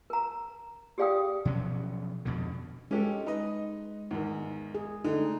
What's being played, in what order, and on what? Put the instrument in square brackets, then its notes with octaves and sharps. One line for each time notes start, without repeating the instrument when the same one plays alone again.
[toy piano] A#4 A#5
G4 G#4 D5 F5 G5 D#6
[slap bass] B2 F3 F#3 C#4
F2 B2 D3
[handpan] G#3 [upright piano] C#4 G4 A4
[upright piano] D#4 B4 D#5
E2 G#2 D#3
[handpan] G#4
[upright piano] D3 [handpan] A3 D#4